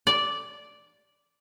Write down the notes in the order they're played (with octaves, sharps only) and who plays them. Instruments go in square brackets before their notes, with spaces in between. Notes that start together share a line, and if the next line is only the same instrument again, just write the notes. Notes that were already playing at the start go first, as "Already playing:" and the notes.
[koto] D5